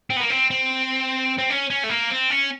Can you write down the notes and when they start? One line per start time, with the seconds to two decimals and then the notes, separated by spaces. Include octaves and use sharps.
0.10 C4
0.16 B3
0.20 A#3
0.30 C4
0.50 C4
1.38 C4
1.50 C#4
1.70 C#4
1.83 A3
1.89 A#3
2.10 C4
2.30 C#4